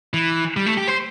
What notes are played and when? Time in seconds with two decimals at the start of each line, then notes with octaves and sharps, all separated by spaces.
0.14 E3
0.56 G3
0.66 A3
0.77 G4
0.88 C5